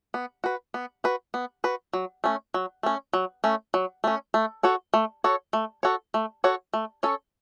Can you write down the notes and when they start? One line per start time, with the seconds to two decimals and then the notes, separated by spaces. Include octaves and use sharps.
0.14 B3
0.44 F#4 B4
0.74 B3
1.04 F#4 B4
1.34 B3
1.64 F#4 B4
1.93 F#3
2.24 A3 C#4
2.54 F#3
2.83 A3 C#4
3.13 F#3
3.44 A3 C#4
3.74 F#3
4.04 A3 C#4
4.34 A3
4.63 F#4 A4 C#5
4.94 A3
5.24 F#4 A4 C#5
5.53 A3
5.83 F#4 A4 C#5
6.14 A3
6.44 F#4 A4 C#5
6.74 A3
7.03 C#4 A4 C#5